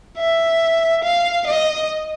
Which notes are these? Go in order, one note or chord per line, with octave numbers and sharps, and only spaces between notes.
E5
F5
D#5